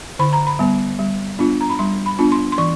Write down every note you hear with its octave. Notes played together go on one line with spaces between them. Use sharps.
D3 B5
A#5
B5
G3 B3
G3
B3 D4 F4
A#5
B5
G3 C6
B5
B3 D4 F4
C6
C6
E3 C#6